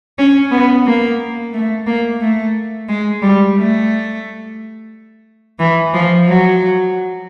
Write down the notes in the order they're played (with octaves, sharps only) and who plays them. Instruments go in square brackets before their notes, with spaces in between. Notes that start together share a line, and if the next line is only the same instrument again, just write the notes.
[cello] C#4
B3
A#3
A3
A#3
A3
G#3
G3
A3
E3
F3
F#3